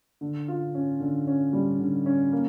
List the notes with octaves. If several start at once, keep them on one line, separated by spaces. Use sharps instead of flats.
D3
F4
C#4
D3
C#4
G3
D3
C#4
A#3